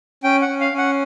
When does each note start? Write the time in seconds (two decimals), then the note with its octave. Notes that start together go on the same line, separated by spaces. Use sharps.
0.23 C#4 G5
0.42 F#5
0.49 C#4
0.61 F5
0.72 C#4
0.78 F#5